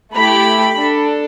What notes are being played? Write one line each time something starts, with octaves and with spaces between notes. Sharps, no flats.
A3 E4 G4 B5
D4 A4